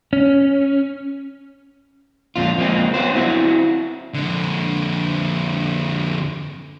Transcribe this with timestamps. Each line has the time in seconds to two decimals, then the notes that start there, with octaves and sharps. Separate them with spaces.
0.13 C#4
2.36 F2 A#2 F4
2.58 F3 G#3 A#3 C4
2.94 F#3 B3 C5
3.15 C4 E4 F#4
4.14 F2 D3